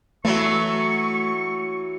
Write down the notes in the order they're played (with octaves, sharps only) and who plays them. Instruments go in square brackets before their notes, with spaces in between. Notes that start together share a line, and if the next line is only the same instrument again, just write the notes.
[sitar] E3 F#3 [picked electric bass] A3 [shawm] C#6